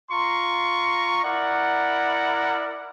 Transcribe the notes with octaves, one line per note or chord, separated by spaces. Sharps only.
F4 A#5 C6 C#6
E4 A#4 D5 F#5